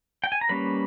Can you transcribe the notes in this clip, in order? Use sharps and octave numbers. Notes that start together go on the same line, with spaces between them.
G5
G#5
A#5
G3 A#3 C#4 B4 B5